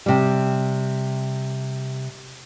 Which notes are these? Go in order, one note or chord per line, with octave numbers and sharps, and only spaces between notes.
C3 G3